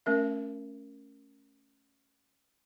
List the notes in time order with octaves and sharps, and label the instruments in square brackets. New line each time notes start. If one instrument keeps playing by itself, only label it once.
[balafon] A3 C#4 A#4 E5